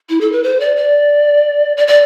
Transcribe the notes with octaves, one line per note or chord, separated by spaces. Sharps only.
E4
A4
B4
C5
D5
D5
D5
D5